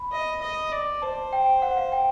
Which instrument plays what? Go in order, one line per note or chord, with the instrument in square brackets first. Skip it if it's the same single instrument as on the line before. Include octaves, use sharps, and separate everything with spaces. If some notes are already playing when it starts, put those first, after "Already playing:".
Already playing: [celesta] B5
[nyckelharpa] D#5
D#5
D5
[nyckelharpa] C5 [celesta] A5
[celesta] G5
F#5
F5
G5